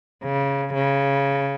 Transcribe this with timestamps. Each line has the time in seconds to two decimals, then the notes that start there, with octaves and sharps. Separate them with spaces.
0.24 C#3
0.74 C#3